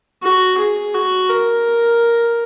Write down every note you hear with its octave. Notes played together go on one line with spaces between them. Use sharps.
F#4
G#4
F#4
A#4